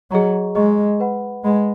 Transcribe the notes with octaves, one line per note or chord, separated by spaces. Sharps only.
F#3 G#4 D#5 A#5 C#6
G#3 G#4 D#5 A#5 C#6
B4 F#5 B5
G#3 B4 F#5 B5